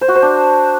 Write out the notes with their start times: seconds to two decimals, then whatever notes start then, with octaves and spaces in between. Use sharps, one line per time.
0.01 C5
0.08 F#4
0.15 C5
0.22 D4